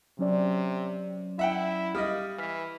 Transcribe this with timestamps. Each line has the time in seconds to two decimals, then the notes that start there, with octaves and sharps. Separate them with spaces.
0.19 C3 F#3 C#4 D5
1.39 E4 E5 F#5 G5
1.95 G3 D#5 F5 D#6 F6
2.38 E3 F6 B6